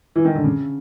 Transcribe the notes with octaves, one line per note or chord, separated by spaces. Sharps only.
E3
D#3
D3
C#3